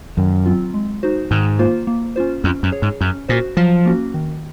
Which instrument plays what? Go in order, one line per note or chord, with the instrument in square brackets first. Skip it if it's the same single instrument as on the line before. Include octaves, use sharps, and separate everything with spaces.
[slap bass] F#2 [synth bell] D#3
[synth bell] F#3 C4 F4
G#3
D#4 F#4 C5
[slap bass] G#2 [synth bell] D#3
[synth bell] A#3 F4 C5
A#3
C#4 F4 C5
[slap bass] F2 [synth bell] C#4
[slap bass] F#2
[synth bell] G#4 C#5
[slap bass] G#2
[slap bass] F#2 [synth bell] C#4
[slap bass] A#2 [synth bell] F#4 C5
[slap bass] F3 [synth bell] F#3
[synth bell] A#3 C#4 F#4
D#3